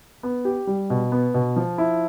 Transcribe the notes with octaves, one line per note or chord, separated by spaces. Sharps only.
B3
G4
G3
B2
B3
B2
F3
E4